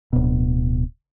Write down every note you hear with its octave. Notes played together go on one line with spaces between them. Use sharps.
D1 B2